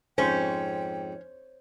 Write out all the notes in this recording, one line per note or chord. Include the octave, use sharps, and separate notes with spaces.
F2 G#2 C#4 C5 G5